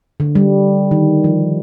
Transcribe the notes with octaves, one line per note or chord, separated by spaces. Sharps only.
D3
G3
D#3
F3